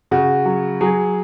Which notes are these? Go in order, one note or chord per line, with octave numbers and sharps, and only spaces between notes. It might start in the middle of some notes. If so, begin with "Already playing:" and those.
C#3 F#4
F#3
F#3 G#4